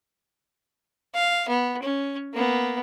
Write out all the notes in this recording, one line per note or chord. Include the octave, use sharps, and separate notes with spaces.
F5
B3
C#4
A#3 B3